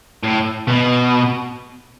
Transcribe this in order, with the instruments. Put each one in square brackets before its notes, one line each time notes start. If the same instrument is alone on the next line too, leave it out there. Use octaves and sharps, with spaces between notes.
[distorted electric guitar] A2
B2